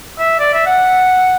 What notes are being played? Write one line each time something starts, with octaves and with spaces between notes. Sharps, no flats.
E5
D5
E5
F#5